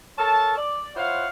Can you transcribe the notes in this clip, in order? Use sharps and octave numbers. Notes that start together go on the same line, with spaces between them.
A4 A#4 C#5 A5
D5
E4 F4 C5 C#5 F5 F#5